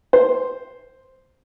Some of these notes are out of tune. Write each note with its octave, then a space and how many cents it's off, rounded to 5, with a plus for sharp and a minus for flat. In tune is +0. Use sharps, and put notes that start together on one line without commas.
C5 +0